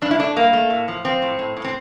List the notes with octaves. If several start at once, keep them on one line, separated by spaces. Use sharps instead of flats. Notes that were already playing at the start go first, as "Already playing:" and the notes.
G2 D4
E4
A3 D4
G2 A#3
A3
A2
F3
F3 C4
A2
A2
A2
C4